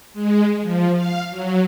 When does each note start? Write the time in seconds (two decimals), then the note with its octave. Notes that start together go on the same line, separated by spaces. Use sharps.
0.13 G#3
0.62 F3
0.94 F5
1.30 F#3